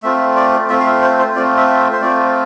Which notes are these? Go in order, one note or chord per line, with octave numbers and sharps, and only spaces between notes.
A3 C4 F4 E5
D5
A3 C4 F4 E5
F5
E5
C5
C5
A3 C4 F4 D5
E5
E5
C5
A3 C4 F4 D5